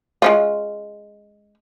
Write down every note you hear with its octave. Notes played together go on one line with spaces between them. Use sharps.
G#3 C#4 F4